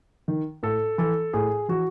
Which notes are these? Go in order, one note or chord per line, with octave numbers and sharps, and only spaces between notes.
D#3
A2 A4
E3 A4
A2 G#4
E3 F#4